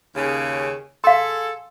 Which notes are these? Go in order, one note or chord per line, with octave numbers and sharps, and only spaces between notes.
D#2 C#3
G#4 A4 F5 C6